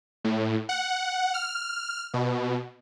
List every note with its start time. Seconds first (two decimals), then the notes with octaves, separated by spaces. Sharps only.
0.24 A2
0.69 F#5
1.34 F6
2.14 B2